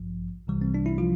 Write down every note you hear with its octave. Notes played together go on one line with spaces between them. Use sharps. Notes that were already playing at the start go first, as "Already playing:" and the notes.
Already playing: A1 G2 F3
C2 C3 E3 G3
C4
D4
E4
F3 F4